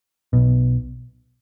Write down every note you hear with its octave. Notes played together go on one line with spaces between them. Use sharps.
B1 B2